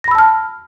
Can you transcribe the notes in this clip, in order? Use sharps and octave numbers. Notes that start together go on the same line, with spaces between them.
A5 B5 E6 F6 A#6